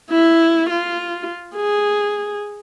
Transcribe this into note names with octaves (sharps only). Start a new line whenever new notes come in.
E4
F4
G#4